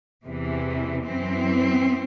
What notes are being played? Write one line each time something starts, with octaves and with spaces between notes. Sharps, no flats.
E2 C3 E3
F#2 E3 C4